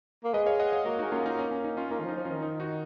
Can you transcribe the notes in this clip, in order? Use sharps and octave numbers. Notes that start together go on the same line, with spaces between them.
A#3
G#3 B4 D#5
C#5 F5
D#5 F#5
C#5 F5
A#3 F#4 A#4
D#4 F#4
G#3
A#3 C#4 F4
D#4
C#4
C#4
D#4
C#4 F4
A#3 D#4
D#3
F3
D#4
F3
C#4 F4
D#3
D#4
D#4 F#4